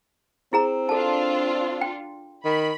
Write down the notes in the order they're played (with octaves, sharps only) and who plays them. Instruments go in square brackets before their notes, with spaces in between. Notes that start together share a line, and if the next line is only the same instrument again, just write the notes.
[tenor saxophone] C4 [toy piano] E4 G#4 A#5
[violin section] D4 F4 [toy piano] A4 A5
[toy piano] G5
[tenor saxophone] D#3 [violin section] B5